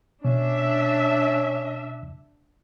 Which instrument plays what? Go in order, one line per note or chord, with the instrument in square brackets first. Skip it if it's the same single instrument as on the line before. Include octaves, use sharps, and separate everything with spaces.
[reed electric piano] B2 [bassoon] C#4 [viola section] D4 E5